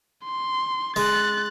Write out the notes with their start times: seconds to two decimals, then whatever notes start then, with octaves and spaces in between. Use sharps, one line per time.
0.25 C6
0.96 G#3 F#6 A6